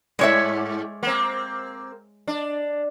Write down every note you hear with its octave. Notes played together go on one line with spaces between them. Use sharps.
G#2 G#3 C#5 E5
A#3 C4
D4